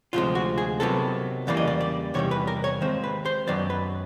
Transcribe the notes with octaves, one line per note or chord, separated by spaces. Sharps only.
D2 C3 F3 G#3 F4
F#4
G#4
C3 D#3 F#3 B3 A4
E2 C#3 E3 G3 A#3 D5
D#5
D5
D5
E2 C3 D#3 G3 C#5
B4
A#4
C#5
D#2 D#3 G#3 C4 C5
B4
C5
F#2 D#3 F#3 B3 D5
B4